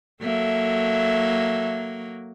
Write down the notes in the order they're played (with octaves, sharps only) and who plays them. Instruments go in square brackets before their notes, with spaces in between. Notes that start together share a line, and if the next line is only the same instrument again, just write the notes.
[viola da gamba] F#3 A#3 [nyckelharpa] A4 E5